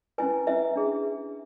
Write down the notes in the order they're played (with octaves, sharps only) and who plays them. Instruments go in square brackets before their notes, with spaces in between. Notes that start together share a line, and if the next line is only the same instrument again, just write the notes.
[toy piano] C#4 E4 B4 G#5
C#4 E4 B4 E5
D4 G#4